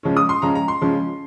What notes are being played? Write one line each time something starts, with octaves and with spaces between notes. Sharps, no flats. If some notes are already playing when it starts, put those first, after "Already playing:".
C#3 F3 G#3 C#4
D#6
C6
C#3 F3 G#3 C#4 A#5
A#5
C6
C#3 F3 G#3 C#4